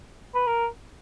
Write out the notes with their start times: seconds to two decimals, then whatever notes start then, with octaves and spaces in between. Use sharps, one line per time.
0.35 B4
0.47 A#4